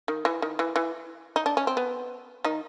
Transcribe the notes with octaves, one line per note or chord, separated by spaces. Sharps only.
D#3
E3
D#3
E3
E3
D#4
D4
C#4
C4
B3
D#3 D#4